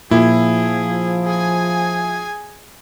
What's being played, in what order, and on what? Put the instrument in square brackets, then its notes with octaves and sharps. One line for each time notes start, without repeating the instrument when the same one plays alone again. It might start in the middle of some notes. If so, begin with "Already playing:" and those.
[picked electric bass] A#2 [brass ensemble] F3 [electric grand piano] E4 [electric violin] G#4
[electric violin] G#4 G#5